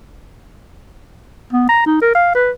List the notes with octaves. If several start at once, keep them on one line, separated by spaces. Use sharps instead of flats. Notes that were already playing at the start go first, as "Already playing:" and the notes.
B3
A#5
D#4
A#4
F5
B4